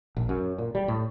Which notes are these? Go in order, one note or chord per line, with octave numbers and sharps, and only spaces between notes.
A#1
F#2
A#2
G3
A2